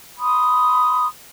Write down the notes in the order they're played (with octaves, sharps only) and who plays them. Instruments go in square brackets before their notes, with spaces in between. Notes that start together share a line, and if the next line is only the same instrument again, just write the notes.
[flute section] B5 C6 D#6